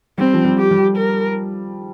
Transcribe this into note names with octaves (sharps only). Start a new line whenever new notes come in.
G3 C4
F3
G3
G4
G3
A#4